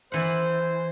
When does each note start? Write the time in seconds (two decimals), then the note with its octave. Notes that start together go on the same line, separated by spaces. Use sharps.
0.12 E3 C5 F#5